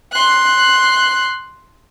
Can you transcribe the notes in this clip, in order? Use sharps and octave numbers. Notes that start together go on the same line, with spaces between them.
C6 F#6